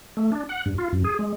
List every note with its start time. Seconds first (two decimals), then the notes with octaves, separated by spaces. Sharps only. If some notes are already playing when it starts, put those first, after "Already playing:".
0.17 A3
0.32 D4
0.49 F#5
0.66 G2
0.78 F4
0.92 F#2
1.04 G#4
1.19 G#3